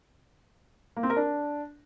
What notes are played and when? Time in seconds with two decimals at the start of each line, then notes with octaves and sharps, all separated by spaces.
0.97 A#3
1.03 C4
1.10 A#4
1.16 D4